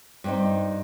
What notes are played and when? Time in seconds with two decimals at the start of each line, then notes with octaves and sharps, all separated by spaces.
0.24 G2 C4 D#4